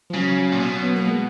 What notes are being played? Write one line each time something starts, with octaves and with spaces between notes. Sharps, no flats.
F3
C#3 F#3
A#2
B2
C#4
B3
A#3
G#3